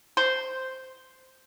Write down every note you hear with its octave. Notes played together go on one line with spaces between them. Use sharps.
C5